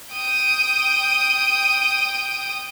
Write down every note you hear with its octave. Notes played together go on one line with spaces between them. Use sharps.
G5 D#6